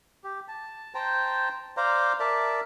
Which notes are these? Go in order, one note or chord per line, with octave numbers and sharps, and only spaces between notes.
G4
A5
C5 G5 A5 A#5
C5 D5 F5 A#5
A#4 D5 E5 A5